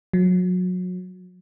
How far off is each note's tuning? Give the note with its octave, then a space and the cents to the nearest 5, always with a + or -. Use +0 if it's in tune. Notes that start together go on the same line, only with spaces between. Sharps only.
F#3 -30